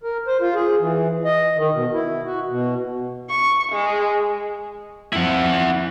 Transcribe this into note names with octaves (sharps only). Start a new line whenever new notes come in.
A#4
C5
F4
G#4
E3
D#5
D#3
B2
E4
F#4
B2
C#6
G#3
F2 E4 F#5